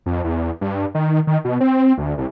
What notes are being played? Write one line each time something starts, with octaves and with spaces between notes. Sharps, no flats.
F2
E2
G2
D#3
D#3
B2
C4
D2
C2